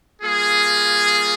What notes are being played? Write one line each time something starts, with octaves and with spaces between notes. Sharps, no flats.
G3 A#3 F4 G#4